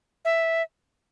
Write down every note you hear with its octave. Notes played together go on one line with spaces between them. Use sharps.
E5